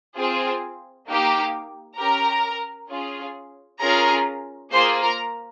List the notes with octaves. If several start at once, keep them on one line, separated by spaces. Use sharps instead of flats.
C4 F4 G#4
A#3 D#4 G4
C#4 G4 A#4 A#5
C#4 F4 G#4
C#4 F4 G#4 A#4 A#5
A#3 F4 G#4 C5 C6
A#4 A#5